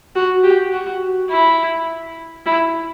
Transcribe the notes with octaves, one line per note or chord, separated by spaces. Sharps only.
F#4
G4
F#4
E4
E4